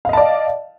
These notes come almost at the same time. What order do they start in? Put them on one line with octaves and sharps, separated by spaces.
F5 D#5 A5 D5